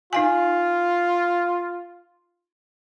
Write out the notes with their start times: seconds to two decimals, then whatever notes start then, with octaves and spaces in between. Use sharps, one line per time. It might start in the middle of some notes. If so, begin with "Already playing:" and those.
0.13 D#4 F4 F5 G#5